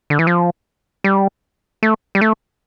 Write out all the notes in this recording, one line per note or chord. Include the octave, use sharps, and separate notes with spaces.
D3
E3
F3
G3
A3
G3
A3